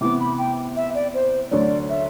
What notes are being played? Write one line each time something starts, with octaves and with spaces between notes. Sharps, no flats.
C3 E3 B3 D6
B5
G5
E5
D5
C5
D2 D3 F#3 D5
E5